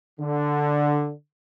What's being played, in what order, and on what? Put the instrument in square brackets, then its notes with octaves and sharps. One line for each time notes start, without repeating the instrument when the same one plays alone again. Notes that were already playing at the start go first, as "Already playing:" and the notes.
[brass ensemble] D3